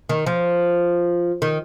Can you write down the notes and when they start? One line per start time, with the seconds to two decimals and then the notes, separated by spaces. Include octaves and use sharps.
0.09 D#3
0.26 F3
1.42 D#3